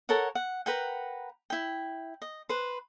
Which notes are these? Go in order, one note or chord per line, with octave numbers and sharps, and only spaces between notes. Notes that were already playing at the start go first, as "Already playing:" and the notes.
A4 A#4 C#5 F#5
F#5
A#4 B4 F#5 G5
E4 G5
D#5
B4 C5